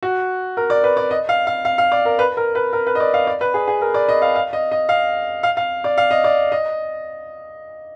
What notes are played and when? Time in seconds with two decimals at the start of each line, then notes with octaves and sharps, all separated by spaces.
0.03 F#4
0.57 A#4
0.70 D5
0.84 B4
0.97 D5
1.11 D#5
1.29 F5
1.47 F5
1.65 F5
1.78 F5
1.92 D5
2.05 A#4
2.19 B4
2.37 A#4
2.55 B4
2.73 A#4
2.87 B4
2.95 D#5
3.00 D5
3.14 F5
3.27 D5
3.41 B4
3.54 G#4
3.68 G#4
3.82 A#4
3.94 D5
4.09 D#5
4.22 F5
4.35 F5
4.53 D#5
4.71 D#5
4.89 F5
5.43 F5
5.57 F5
5.84 D5
5.98 F5
6.11 D#5
6.24 D5
6.52 D#5